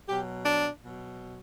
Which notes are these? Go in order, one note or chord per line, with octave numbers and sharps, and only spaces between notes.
B2 F#3 G4
D4
B2 F#3